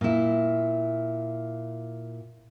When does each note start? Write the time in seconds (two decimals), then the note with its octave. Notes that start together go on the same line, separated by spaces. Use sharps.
0.01 A#2 E4